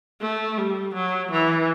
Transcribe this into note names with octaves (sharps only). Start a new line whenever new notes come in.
A3
G3
F#3
E3